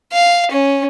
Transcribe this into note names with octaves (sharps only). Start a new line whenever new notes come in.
F5
C#4